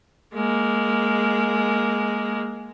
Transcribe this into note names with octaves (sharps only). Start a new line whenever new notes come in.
G#3 A#3